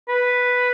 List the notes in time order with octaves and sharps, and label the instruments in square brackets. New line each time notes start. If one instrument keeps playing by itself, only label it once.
[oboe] B4